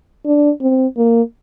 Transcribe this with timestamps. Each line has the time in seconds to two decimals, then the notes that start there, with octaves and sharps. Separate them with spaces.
0.26 D4
0.61 C4
0.97 A#3